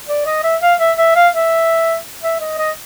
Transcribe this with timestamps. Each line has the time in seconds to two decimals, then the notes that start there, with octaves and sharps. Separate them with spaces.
0.08 D5
0.26 D#5
0.43 E5
0.62 F5
0.79 E5
0.98 E5
1.15 F5
1.33 E5
2.23 E5
2.40 D#5
2.58 D#5